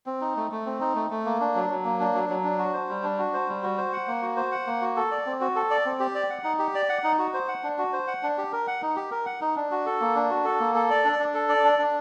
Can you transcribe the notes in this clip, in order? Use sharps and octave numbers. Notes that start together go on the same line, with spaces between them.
C4
D#4
A3
A3
C4
D#4
A3
A3
A#3
D4
F#3
F#3
A#3
D4
F#3
F#3
D4
F#4
C5
G3
D4
F#4
C5
G3
F#4
C5
F#5
A#3
F#4
C5
F#5
A#3
F#4
A4
D5
C4
F#4
A4
D5
C4
G4
D5
F#5
D#4
G4
D5
F#5
D#4
F#4
C5
F#5
D4
F#4
C5
F#5
D4
G4
A#4
F#5
D#4
G4
A#4
F#5
D#4
D4
F#4
A4
A#3
D4
F#4
A4
A#3
A4
D5
D4
D4
A4
D5
D4
D4